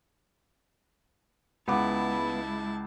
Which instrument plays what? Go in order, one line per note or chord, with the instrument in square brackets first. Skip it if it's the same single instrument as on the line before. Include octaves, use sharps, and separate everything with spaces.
[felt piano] C#2 F#5 D6 [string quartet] G#3 E4 A5 [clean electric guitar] B3